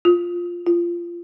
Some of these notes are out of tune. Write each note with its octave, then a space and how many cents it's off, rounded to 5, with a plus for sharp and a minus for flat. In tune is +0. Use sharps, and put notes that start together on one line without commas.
F4 +0
F4 -20